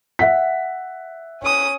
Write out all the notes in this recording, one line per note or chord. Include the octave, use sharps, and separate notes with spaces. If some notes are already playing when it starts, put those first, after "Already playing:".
E5 F#5 B6
C#4 D#6